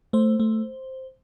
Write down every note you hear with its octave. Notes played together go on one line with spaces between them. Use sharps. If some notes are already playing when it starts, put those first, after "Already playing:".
A3 C5
A3